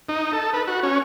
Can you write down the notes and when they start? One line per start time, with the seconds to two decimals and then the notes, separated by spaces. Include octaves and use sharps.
0.09 D#4
0.33 A4
0.53 B4
0.67 F#4
0.83 C#4